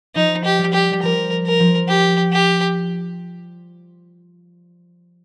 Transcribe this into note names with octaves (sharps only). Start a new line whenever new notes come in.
F3 D#4
G4
G3
G4
G3
F3 A#4
A#4
F3
G4
G4